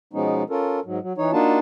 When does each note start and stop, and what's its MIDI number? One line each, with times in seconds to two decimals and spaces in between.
0.13 0.43 47
0.13 0.43 53
0.13 0.43 56
0.13 0.43 59
0.13 0.43 61
0.13 0.43 63
0.50 0.80 61
0.50 0.80 65
0.50 0.80 69
0.50 0.80 70
0.85 0.99 44
0.85 0.99 54
1.02 1.13 54
1.18 1.32 52
1.18 1.32 63
1.18 1.32 73
1.33 1.59 58
1.33 1.59 62
1.33 1.59 63
1.33 1.59 65
1.33 1.59 66
1.33 1.59 81